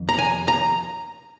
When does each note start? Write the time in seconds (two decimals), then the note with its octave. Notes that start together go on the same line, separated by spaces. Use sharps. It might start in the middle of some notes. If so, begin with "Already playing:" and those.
Already playing: F2 D#3
0.09 A#5
0.19 G#5
0.48 A#5